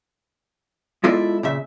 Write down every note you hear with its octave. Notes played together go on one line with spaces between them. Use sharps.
G#3 B3 E4 F4 A4 D5
A#2 C#3 E5